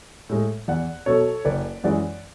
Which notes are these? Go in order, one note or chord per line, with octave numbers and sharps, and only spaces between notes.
A2 G#3
E2 D5 F#5
B2 F#3 A4 C#5
F#1 B4 D5
F#2 E3 G#3 D5 F#5